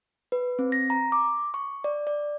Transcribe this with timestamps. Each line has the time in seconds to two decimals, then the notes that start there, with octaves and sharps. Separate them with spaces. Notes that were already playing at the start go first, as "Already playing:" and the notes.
0.32 B4
0.59 C4
0.72 A#6
0.90 A#5
1.12 D6
1.54 C#6
1.84 D5
2.07 D5